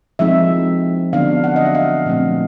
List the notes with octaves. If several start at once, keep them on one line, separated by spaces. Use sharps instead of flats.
F3 G#3 C4 D#4 E5
D3 F#3 B3 D4 F5
F#5
D#5
E5
F5
A#2 F3 A3 C4